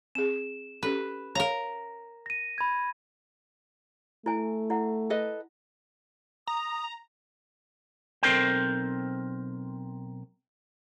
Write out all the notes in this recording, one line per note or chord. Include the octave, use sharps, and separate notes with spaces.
C4 G#4 E7
C#4 G4 A4 B4
A#4 C#5 F5 A#5
A#6 D#7
B5 G#6
A3 E4 G#5
E4 F#5
A4 B4 D#5
A#5 D#6
B1 C4 A4 A#4 C5 G5